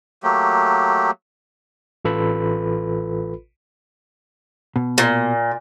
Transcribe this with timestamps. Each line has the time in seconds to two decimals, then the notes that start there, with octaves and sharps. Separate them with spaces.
0.23 F#3 A3 A#3 G4
2.05 A1 F4 A4 B4 B5
4.76 B2
4.98 A#2